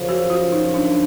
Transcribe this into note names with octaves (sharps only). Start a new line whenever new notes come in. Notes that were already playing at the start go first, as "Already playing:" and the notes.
Already playing: F#2 C#3 F3
F#4
F4
D#4
D4